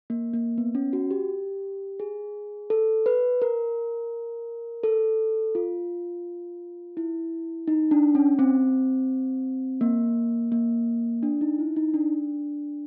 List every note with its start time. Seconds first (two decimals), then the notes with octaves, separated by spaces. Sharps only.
0.10 A#3
0.34 A#3
0.58 B3
0.75 C#4
0.93 F#4
1.11 G4
2.00 G#4
2.70 A4
3.06 B4
3.42 A#4
4.83 A4
5.55 F4
6.97 E4
7.68 D#4
7.91 D4
8.15 C#4
8.39 C4
9.81 A#3
10.52 A#3
11.23 D4
11.41 D#4
11.59 E4
11.76 D#4
11.94 D4